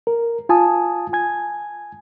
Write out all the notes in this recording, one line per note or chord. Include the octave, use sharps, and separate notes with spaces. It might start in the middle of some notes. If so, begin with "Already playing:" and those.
A#4
F4 G#5 A5 D#6
G#5 G#6